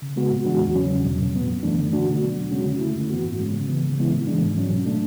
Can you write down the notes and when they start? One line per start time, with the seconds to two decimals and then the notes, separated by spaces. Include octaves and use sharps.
0.02 C#3
0.16 G#3 B3 F#4
0.31 A2
0.45 E3 G#3 D4 F#4
0.60 E2
0.75 C#3 F#3 C#4
0.89 E2
1.04 B2 F#3
1.19 A2
1.33 F#3 B3
1.48 F#2
1.63 E3 A3 D4
1.78 D3
1.92 A3 D4 F#4
2.07 B2
2.22 F#3 B3
2.36 E2
2.51 C#3 G#3 C#4 F#4
2.66 D3
2.80 A3 E4
2.95 F#2
3.10 E3 B3 F#4
3.24 G#2
3.39 G#3 C#4
3.53 C#3
3.68 E3 B3
3.83 C#3
3.98 E3 G#3 B3 E4
4.12 A2
4.27 E3 G#3 D4
4.42 G#2
4.56 F#3 C#4
4.71 B2
4.86 A3 D4